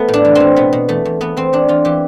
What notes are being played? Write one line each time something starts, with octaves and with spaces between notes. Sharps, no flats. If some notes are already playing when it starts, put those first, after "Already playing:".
Already playing: A3 B3
A2
D4
E3
E3 C4
B2 B3
B2
E2 A3
E2
E2 B3
E2 C4
E2 D4
E2 F4
E3 G4